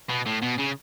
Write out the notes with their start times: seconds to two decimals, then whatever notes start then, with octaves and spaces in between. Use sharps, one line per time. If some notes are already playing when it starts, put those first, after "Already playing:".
0.10 B2
0.26 A2
0.43 B2
0.59 C#3